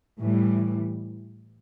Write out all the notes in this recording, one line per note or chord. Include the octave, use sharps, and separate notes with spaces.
A2 E3 G3